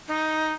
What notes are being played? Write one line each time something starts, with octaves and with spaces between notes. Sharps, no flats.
D#4